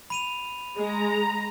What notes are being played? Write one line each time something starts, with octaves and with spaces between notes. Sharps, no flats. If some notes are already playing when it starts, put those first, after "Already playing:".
B5 D#7 F7
G#3 A#5